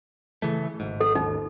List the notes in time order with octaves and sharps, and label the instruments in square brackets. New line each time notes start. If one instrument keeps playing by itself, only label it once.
[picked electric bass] C#3 E3 A3
G#1 G#2
[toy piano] A4
[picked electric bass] G#1 D#2 [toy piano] D#4